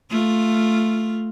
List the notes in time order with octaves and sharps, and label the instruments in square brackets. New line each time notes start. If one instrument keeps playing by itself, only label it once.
[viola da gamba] A3 F4